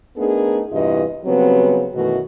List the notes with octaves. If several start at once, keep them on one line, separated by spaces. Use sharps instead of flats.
A3 B3 D4 D#4 G#4 A#4
E2 G2 C3 E3 F4 D#5
C#3 F#3 G3 B3 C4
F#2 B2 D#3 E3 A3 F#4